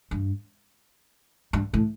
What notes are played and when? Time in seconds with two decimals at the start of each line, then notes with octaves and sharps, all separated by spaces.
0.11 G2
1.53 G2
1.74 A2